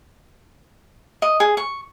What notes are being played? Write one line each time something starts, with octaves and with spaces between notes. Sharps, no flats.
D#5
G#4
C#6